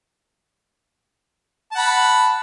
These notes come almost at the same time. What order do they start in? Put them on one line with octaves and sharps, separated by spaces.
A5 F#5 B5